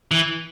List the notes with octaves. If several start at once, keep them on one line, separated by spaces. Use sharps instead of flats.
E3